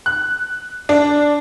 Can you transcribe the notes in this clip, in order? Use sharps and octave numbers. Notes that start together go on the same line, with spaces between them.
F#6
D4